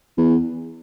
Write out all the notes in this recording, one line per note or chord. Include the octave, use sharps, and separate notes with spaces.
E2